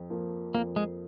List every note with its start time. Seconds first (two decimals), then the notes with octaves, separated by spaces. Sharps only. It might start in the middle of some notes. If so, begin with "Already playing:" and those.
Already playing: F2
0.10 F3 A#3
0.54 F2 A#3
0.76 G#3